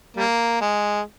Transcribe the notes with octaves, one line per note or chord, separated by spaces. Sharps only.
G3 A#3
G#3